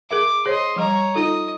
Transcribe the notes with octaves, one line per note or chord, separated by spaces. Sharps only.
G#4 A#4 E5 D6
G#4 C5 C#5 D#5 C6
F3 G3 C#5 D#5 A#5
D#4 F4 A4 D#5